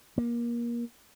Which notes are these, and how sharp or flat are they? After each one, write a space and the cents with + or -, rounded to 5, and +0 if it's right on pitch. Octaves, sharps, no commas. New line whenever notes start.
A#3 +25